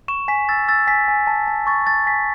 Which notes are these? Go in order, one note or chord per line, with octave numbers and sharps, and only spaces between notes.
C#6 E7
G#5 B6
E6 A6
E6 A6
G#5 B6
G#5
A5
A5
C#6 A6
A5 A6
G#5 B6